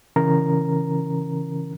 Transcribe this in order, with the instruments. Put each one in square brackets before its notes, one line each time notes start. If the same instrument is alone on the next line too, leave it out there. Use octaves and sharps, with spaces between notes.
[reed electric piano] C#3 E3 C#4 A#4 A#5